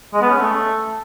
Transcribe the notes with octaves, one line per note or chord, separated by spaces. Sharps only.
G#3
B3
C#4
A3